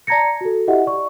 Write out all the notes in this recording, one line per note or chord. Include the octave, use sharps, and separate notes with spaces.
D5 A5 A#5 G#6 A#6 C#7
F#4 A4
E4 G4 D#5 E5 F#5
D5 C#6